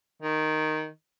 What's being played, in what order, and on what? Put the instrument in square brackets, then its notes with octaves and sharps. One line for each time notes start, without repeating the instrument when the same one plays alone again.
[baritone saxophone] D#3